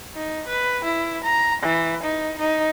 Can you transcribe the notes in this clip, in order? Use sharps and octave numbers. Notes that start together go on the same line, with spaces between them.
D#4
B4
E4
A#5
E3
D#4
D#4